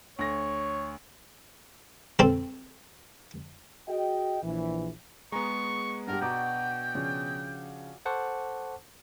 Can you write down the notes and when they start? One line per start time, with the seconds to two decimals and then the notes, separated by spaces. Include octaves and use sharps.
0.19 D2 C#5 A#6
2.19 C4 A4
3.88 F#4 G#4 D#5 G5
4.43 A#1 E3
5.32 G#3 B3 G#4 B4 A#5 C#6
6.07 G2 G4 A#4 F#5
6.21 B2 D4 F#4 G5 A#5 D6
6.95 C#3 F3 D4
8.05 A4 C5 F#5 A5 C#6 D6